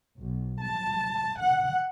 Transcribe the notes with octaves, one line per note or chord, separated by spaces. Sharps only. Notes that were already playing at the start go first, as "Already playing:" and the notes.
B1
A5
F#5